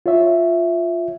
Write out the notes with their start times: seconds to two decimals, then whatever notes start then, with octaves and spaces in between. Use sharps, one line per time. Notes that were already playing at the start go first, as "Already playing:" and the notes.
0.06 F4 C#5 E5